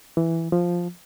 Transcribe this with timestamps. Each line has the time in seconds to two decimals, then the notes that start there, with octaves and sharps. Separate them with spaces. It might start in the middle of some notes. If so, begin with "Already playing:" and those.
0.17 E3
0.52 F3